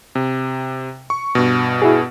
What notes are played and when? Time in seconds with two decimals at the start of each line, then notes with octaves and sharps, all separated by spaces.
0.15 C3
1.10 C#6
1.35 G2 B2
1.82 E4 F#4 G#4